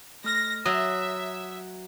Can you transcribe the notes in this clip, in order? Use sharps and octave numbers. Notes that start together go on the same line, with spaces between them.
A3 F6 A#6
F#3 E5 D#6 E6